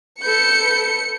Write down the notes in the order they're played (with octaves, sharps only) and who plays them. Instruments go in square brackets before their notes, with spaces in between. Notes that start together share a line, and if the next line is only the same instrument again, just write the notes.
[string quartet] A4 B4 G6 [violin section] C#7